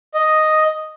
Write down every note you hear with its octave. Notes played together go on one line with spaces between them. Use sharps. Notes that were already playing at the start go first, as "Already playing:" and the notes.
D#5